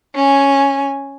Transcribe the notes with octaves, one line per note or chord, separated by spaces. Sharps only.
C#4 G#5